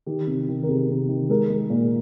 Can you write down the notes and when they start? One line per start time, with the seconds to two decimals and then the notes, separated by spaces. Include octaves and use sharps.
0.06 D#3 G4
0.27 C3
0.49 D#3
0.63 A#4
0.68 C3 G#4
0.89 C3
1.09 D#3
1.29 G#3 A#4
1.50 G#3
1.70 A#2